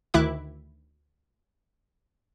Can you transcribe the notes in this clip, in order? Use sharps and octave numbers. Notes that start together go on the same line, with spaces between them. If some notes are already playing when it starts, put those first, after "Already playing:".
D2 D#3 E4 E5 D6 F#6